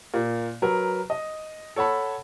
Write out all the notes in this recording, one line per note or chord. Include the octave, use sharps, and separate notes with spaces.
A#2
F#3 A#4 B4
D#5
A4 C#5 F#5 A5 B5